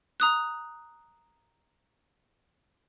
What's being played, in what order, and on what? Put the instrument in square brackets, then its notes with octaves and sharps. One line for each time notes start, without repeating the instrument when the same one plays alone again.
[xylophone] A#5 D#6 F#6